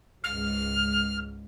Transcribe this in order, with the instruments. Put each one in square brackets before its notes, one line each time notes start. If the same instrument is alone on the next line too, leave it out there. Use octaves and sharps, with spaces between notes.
[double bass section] C#2 G#2 [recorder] F6